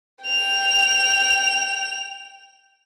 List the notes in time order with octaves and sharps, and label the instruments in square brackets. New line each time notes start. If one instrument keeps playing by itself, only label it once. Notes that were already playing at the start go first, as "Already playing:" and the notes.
[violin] G5 F7